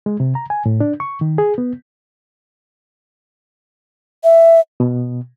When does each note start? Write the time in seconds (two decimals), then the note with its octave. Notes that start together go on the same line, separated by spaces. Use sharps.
0.06 G#3
0.20 C3
0.35 A#5
0.50 G#5
0.66 A2
0.80 D4
1.00 C#6
1.21 D#3
1.38 G#4
1.58 B3
4.24 E5
4.80 B2